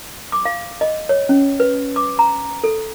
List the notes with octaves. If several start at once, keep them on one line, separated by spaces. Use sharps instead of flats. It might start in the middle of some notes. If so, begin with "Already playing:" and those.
D6
F5
D#5
C#5
C#4
B4
D6
A#5
A4